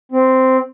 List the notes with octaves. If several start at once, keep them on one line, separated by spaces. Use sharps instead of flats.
C4